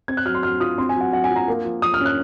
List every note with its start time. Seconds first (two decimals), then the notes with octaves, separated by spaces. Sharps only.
0.08 C4 G#6
0.17 F#6
0.25 F#3 F6
0.35 C6
0.43 F#3 F6
0.60 F4 D#6
0.78 C4 C6
0.89 G#5
0.95 F#3
1.01 F#5
1.12 F#3 F#5
1.24 G#5
1.30 F4
1.36 A#5
1.48 A#3
1.65 F3
1.82 F3 D#6
1.94 F6
2.00 C#4
2.06 F#6